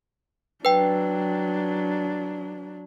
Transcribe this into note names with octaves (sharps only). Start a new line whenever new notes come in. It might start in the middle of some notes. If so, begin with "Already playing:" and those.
F#3 D4 B4 G5